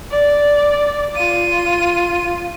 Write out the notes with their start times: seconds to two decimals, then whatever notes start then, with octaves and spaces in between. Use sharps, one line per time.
0.11 D5
1.16 F4 D#7